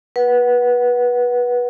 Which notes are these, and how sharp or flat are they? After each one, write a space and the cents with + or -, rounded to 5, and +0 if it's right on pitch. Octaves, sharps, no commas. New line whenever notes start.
B4 -20 F#5 +0